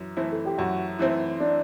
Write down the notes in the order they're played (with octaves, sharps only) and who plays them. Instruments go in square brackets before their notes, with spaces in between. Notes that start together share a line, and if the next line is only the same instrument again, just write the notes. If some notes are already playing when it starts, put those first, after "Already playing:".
Already playing: [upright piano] F#2 E3 E4
E3 A3 C4 E4
[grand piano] A4
G4
[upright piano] F#2 [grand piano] F#4
[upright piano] E3 A3 C4 E4
[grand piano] D4